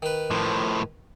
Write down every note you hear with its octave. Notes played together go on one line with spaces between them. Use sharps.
D#3 B4
A2 F3